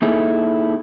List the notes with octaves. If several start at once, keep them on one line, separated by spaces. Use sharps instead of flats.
A#3 D#4 E4 G#4 A4